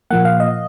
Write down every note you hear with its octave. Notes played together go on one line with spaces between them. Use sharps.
A#2 F3 A#3 F#5
F5
D#5